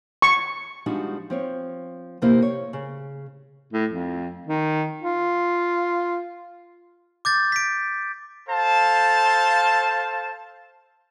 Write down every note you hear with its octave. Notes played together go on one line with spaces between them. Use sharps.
C#6
F3 G3 G#3 D4 D#4 F#4
F3 C4 C#5
F2 C3 A#3 E4 C5
C#5
C#3
A2
F2
D#3
F4
D6 G6 A6
B6 D7
A4 C5 F5 A5